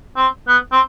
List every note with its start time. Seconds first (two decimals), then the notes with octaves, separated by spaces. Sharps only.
0.17 C4
0.48 B3
0.72 C4